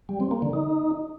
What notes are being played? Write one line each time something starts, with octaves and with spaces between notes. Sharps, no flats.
G3
C4
A#3
D3
D#4